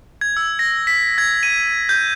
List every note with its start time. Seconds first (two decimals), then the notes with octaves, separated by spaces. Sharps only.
0.21 G#6
0.37 E6
0.59 A#6
0.87 B6
1.18 G#6
1.43 D#7
1.89 G6